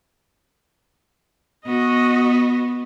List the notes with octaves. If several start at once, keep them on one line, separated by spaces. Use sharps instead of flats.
B3 F#4 D#5